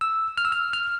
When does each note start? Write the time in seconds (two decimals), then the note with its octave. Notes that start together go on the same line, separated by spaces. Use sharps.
0.01 E6
0.38 F6
0.45 E6
0.52 F6
0.73 F6